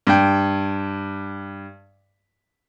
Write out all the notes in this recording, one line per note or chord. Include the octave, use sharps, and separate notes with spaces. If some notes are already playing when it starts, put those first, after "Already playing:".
G2 G5